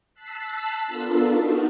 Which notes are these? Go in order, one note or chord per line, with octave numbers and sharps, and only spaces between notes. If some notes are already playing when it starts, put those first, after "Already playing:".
A5 E6 F#6 B6 C7
B3 D4 F4 A4 A#4
D#4 F#4